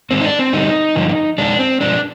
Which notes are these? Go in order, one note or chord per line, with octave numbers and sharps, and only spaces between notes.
G#2 D#3 G#3 C4
D#4
D4
C4
G2 D3 G3 D#4
G2 D3 F3
F2 D#3 G#3 D4
C4
G2 F3 G#3 D4